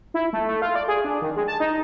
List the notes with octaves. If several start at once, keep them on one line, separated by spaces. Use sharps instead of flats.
E4
A3
A3
F4
D5
G#4
D4
D#3
G#3
A5
D#4